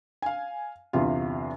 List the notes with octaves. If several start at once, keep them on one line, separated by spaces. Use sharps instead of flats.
F5 G#5
G1 E2 C3 F4